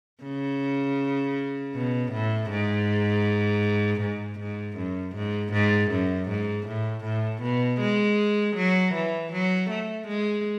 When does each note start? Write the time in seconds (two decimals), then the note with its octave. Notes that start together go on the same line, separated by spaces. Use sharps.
0.23 C#3
1.75 B2
2.12 A2
2.50 G#2
4.02 G#2
4.40 G#2
4.77 F#2
5.16 G#2
5.53 G#2
5.91 F#2
6.29 G#2
6.67 A2
7.04 A2
7.42 B2
7.81 G#3
8.56 F#3
8.94 E3
9.33 F#3
9.70 A3
10.08 G#3